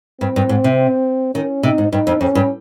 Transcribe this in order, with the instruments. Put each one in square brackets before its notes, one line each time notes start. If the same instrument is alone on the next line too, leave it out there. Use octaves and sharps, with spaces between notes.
[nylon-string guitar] G2 [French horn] C4
[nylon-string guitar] G2
G#2
C3
[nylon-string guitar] D#3 [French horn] C#4
[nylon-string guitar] C3 [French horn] D#4
[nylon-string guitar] G#2
[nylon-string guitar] G2 [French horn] D#4
[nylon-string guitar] F2
[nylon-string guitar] F2 [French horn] C#4
[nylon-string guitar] G2